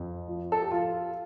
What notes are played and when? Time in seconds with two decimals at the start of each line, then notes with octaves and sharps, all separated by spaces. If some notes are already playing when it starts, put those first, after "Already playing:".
Already playing: F2
0.28 F3
0.52 A4
0.62 G4
0.71 F3 F4